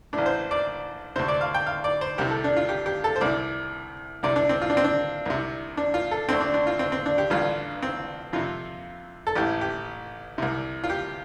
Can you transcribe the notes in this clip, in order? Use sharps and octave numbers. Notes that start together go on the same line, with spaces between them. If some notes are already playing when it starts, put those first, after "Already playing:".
A1 A2 D4
C5
D5
D2 C3 C5
D5
F5
G5
F5
D5
C5
C2 C3 G4
A4
D4
F4
G4
G4
A4
C5
C2 C3 D5
C2 C3 D5
D4
C4
F4
D4
C4
D4
C2 C3
D4
F4
A4
D2 D3 C4
D4
D4
F4
C4
C4
D4
G4
A1 G2 D3 F4
C4
F2 C3 F4
A4
A1 A2 G4
G4
C2 C3
F4
G4